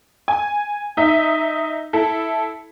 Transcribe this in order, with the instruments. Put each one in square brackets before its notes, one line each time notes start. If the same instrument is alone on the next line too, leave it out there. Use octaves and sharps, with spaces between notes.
[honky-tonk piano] G#5
D#4 E5
E4 A4